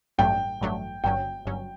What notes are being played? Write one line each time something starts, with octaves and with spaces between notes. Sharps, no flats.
A1 G2 F#3 A3 D4 G5
A1 G2 F#3 A3 D4
G1 G2 F#3 C#4 G5
G1 G2 F#3 C#4